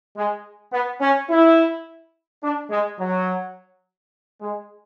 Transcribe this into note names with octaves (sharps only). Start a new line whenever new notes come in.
G#3
B3
C#4
E4
D4
G#3
F#3
G#3